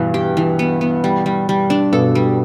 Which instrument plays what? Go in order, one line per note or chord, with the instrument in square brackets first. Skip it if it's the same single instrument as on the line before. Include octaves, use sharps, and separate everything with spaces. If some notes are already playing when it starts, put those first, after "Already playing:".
Already playing: [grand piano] G2 B2 [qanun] E3
[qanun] G4
E3
B3
B3
G3
G3
G3
D4
[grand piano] G2 B2 [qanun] A4
[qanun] G3